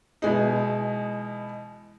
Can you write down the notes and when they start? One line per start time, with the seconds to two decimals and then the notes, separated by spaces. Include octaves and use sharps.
0.22 B2 E3 G#3 D#4